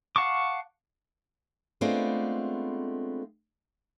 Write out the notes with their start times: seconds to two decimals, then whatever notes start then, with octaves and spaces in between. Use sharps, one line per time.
0.16 F5 F#5 A5 C#6 D6
1.81 G#3 A3 B3 C4 D4 F4